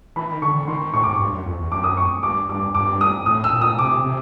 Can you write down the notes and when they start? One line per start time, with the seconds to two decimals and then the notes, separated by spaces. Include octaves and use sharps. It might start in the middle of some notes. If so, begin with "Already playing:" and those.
0.16 E3 B5
0.29 D#3
0.42 D3 C#6
0.55 D3
0.68 D#3 C6
0.81 D#3
0.94 A2 C#6
1.03 G#2 D6
1.12 C#6
1.19 G2
1.32 F#2
1.45 F2
1.59 E2
1.72 F#2 D6
1.84 D#6
1.97 C#6
2.23 G2 D6
2.49 G2 D6
2.75 G2 D6
3.01 D#6
3.26 A2 D#6
3.44 E6
3.53 A#2
3.61 D#6
3.78 C3 D6
4.04 C3